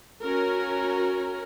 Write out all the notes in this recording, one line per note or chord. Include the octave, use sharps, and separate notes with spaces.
C#4 F#4 A#4